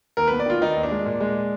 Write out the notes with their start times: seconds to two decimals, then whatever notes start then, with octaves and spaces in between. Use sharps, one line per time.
0.17 D#2 A#4
0.28 B3 B4
0.40 D5
0.46 D#3 F4
0.61 D#3 D#4
0.76 D#2
0.83 D4
0.91 G#3
1.06 A#2
1.21 G#3